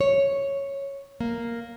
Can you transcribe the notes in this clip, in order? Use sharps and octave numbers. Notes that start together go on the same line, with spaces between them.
C#5
A#3